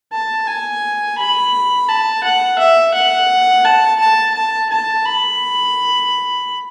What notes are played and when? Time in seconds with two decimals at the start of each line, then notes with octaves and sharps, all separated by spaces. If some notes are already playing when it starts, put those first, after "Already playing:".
0.12 A5
0.47 G#5
1.18 B5
1.89 A5
2.24 F#5
2.59 E5
2.94 F#5
3.65 A5
4.00 A5
4.35 A5
4.70 A5
5.06 B5